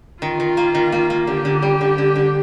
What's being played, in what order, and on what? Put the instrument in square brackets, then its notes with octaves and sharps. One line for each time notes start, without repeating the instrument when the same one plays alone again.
[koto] D#3 [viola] F4
[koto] D#3
A#3
D#3
A#3
A#3
[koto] D3 [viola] G4
[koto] D3
G3
D3
D3
D3